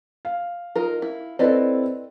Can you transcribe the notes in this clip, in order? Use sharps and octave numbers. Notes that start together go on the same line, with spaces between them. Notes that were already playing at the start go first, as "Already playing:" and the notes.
F5
D#4 F4 A#4
E4
C4 E4 A4 B4 D5 D#5